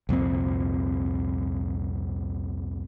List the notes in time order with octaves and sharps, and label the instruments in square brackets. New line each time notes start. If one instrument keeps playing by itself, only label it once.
[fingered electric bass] C2 F2 A#2 C4